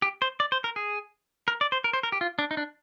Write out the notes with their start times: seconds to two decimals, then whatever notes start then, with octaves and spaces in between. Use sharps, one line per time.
0.02 G4
0.22 C5
0.40 D5
0.52 C5
0.64 A#4
0.76 G#4
1.48 A#4
1.61 D5
1.72 C5
1.84 A#4
1.93 C5
2.03 A#4
2.12 G4
2.21 F4
2.39 D4
2.51 D#4
2.57 D4